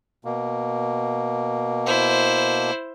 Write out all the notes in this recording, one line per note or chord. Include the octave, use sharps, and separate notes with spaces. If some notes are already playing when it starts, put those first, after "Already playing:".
B2 A#3
E4 C5